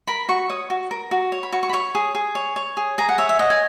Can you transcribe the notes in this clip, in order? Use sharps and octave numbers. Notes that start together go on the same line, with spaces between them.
A#4 B5
F#4 C#6
C#5 D#6
F#4
A#4
F#4
C#5
B5
F#4 C#6
C#6
B5
C#5 C#6
G#4
G#4
C#5
C#5
G#4
G#4 A#5
F#5
C#5 E5
E5
D#5 F#5
G#5